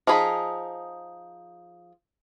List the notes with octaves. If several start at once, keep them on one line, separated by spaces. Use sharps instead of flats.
F3 D#4 G#4 B5